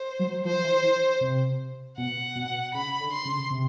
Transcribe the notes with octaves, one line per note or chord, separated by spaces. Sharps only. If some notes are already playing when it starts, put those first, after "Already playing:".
Already playing: C5
F#3
F3 C5
E3
E3
C3
B2 F#5
B2
C#3 B5
D3
C6
C#3
C3